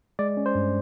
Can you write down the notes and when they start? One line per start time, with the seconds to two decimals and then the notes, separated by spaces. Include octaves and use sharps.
0.19 G#3 D5
0.37 C#4
0.46 C5
0.55 G2